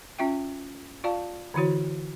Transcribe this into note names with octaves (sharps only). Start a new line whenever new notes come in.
C#4 F4 E5 G5
F4 D5 F5 A5
D3 E3 E4 F#4 C#5